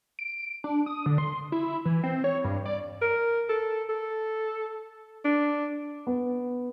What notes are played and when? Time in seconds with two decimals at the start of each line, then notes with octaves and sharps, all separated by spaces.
0.19 D7
0.64 D4
0.86 D#6
1.06 D3
1.18 C6
1.52 E4
1.85 E3
2.04 C4
2.24 C#5
2.44 G2
2.66 D5
3.02 A#4
3.49 A4
3.89 A4
5.25 D4
6.07 B3